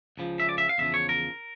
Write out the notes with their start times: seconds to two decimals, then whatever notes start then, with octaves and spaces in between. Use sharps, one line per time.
0.18 C#2 C#3 F3
0.40 E5
0.49 D5
0.58 E5
0.69 F5
0.78 E2 C#3 F3 E5
0.94 C#5
1.09 A#4